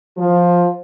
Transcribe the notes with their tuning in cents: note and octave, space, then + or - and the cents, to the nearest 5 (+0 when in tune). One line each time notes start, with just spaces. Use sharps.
F3 +10